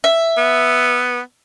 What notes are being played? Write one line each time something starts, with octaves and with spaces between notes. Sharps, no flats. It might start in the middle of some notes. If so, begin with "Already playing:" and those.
E5
B3